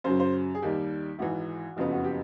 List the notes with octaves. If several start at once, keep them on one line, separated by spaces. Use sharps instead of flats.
F#2 C#3 F#3 C5
C5
G#4
D#2 D#3 G3 G4
G#1 G#2 E3 F#4
F#1 F2 C#3 F#3 B3
F#4
G4